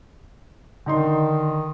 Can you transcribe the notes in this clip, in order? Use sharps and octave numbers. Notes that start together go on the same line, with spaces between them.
D3 D#3 D#4 C6